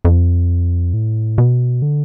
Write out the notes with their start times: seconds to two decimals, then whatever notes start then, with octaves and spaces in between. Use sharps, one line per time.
0.05 F2
0.94 A2
1.38 B2
1.82 D3